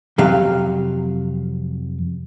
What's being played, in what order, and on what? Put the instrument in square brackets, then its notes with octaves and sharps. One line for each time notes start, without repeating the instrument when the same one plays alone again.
[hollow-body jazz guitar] F2 C3 F#3 F5